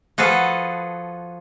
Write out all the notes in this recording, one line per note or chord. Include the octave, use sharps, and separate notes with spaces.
F3 F#4 G#4 A4 B4